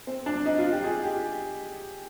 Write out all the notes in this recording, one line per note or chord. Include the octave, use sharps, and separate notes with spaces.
C4
D4
D#4
F4
G4
G#4
G4